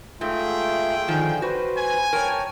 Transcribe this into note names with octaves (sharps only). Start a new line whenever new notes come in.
G#2 A3 F4 G#4 E5 G5
D3 D#3 F3 G#5
F#4 B4 C5
G#5
A#4 C#5 G5 A5 C#6